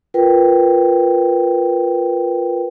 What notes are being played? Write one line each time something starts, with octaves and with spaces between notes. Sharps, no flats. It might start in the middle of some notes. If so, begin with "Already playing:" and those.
F4 A#4 B4 G5